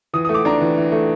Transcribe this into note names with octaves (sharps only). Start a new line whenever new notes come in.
E3 D#6
D#6
A3
D6
D4 A#5
E3
E3
A3